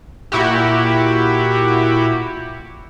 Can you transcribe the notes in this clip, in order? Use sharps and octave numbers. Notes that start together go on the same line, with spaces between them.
A#2 E4 F#4 G4